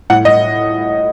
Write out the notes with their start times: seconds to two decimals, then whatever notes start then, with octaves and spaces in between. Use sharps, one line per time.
0.10 A2 F#5
0.25 D#5